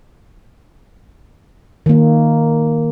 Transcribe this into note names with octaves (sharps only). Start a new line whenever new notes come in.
D#3 A#3